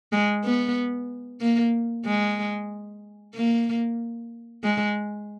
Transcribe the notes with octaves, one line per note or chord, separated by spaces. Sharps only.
G#3
B3
A#3
G#3
A#3
G#3